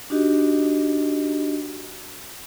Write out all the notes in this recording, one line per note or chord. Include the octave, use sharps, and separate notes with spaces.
D4 D#4 F#4 G4 D#5